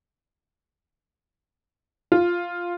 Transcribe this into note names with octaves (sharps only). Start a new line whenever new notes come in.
F4